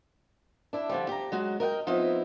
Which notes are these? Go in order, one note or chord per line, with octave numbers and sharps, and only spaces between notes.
D4 E4
D3 F3 G3
G4 A#5
F#3 G#3 F#4
A#4 D#5 F#5 G5
F3 B3 C4 D#4 E4